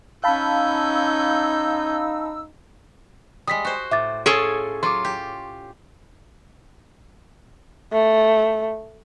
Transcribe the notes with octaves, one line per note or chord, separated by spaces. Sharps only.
C#4 D#4 F5 A5 B5 E6 G6
G3 G#3 D#6 B6
F#4 C5
A2 E5 D6 A6
C#4 F4 G#4 A4 C#5 D7
F#3 F4 C6 D6
G4
A3